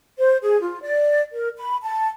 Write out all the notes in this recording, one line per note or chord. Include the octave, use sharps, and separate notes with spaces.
C5
G#4
F4
D5
A#4
B5
A5